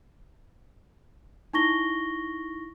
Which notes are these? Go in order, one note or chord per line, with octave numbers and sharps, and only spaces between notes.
D#4 E4 C#6 A#6 G7